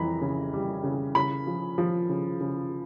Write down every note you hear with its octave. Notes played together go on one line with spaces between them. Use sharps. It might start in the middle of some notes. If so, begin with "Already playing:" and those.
Already playing: F2 E3 A#5 B5
C#3
G3
C#3
C#3 B5
F3
F3
C#3
C#3